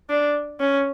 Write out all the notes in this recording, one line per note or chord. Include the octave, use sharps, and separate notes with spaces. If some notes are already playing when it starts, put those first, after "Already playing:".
D4
C#4